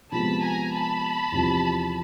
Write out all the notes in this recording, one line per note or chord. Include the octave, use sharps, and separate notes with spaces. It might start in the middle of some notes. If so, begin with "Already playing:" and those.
C3 F3 G#3 B3 A5 B5
G#5 A#5
A5 B5
E2 C3 F3